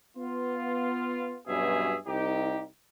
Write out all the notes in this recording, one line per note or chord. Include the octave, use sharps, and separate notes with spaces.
B3 F4
G2 B2 F#3 C#4 G#4 E5
C2 D#4 G4